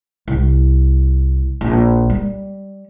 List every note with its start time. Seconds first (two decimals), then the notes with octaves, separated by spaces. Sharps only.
0.28 C2
1.61 A#1
2.10 G3